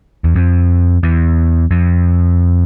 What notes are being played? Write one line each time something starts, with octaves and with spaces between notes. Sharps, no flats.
E2
F2
E2
F2